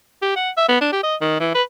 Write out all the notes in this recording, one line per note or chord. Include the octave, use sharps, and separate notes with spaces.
G4
F#5
E5
B3
D4
G4
D#5
D#3
E3
B4